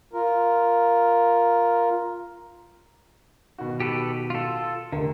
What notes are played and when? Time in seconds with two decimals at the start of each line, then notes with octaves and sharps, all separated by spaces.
0.13 F4 A#4
3.58 B2 D#3 F#4
3.80 G4 A4 B4
4.30 F4 A4
4.92 F1 D3 A#4